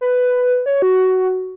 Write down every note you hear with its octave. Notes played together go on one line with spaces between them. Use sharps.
B4
C#5
F#4